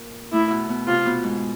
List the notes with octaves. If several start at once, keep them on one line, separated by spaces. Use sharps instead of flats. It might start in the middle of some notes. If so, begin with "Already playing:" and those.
Already playing: A#2 A#3
A2 A3 E4
B2 B3
B2 B3
C3 C4 F4
B2 B3
G#2 G#3